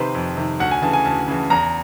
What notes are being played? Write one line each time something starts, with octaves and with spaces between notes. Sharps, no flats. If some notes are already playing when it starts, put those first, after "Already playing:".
Already playing: C3 D#3 B4 C5
F2
C3 D#3
D2 F#5
G#5
C#3 E3 A5
G#5
D2 A5
C#3 E3
E2 A#5